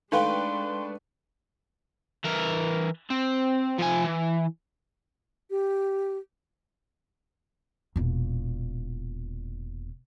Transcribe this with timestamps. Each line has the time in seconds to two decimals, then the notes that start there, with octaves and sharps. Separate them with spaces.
0.12 G#3 A3 D4 D#4 B4 F5 G5 C6
2.24 E3 A#4
3.10 C4
3.78 F3 G#5
4.04 E3
5.50 G4
7.96 E1 A#2